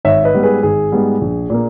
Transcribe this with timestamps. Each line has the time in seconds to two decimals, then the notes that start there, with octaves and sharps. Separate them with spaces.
0.05 G#1 C#5 E5
0.24 B4 D#5
0.34 G#2 G3 B3
0.43 G#4 B4
0.63 G#1 G#4
0.92 G#2 G3 B3
1.21 A#1
1.50 A#2 A#3